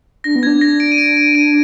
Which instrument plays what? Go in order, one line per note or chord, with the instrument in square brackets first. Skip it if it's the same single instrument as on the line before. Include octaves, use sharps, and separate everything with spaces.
[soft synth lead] D4 [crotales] A#6
[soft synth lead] B3
[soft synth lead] D4 [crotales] G#6
[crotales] A#6
D7
D#7
D7
D7
D#7